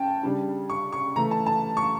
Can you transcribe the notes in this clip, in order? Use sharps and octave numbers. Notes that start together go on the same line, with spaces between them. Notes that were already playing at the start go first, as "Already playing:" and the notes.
Already playing: C#4 G5 A5
C#3 G3 D4
C#6
C#6
C#3 E3 A3 A#5
A5
A5
C#6